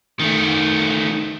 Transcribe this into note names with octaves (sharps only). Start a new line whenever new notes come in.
D#3 A3